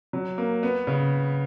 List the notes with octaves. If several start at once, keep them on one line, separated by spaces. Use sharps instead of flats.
F#3
A#3
B3
C#3